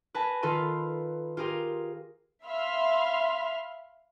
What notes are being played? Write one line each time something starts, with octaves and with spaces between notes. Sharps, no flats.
B4 G#5 A5 A#6
D#3 F4 A4 B4 C6 D#7
F4 G4 G#4 A#4
E5 F5 B5 C6 F6